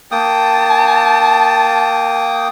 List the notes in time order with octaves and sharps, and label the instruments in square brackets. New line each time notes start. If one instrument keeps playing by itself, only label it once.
[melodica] A#3 G5 D#6 [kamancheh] A5